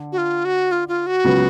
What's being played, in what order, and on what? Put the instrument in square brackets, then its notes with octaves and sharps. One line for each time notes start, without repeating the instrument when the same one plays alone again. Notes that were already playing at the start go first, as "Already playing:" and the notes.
Already playing: [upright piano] D3
[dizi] F#4
F4
F#4
F4
F4
F#4
[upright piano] C#2 C#3 F#3 B3